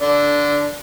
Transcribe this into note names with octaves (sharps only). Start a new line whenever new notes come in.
D3 D4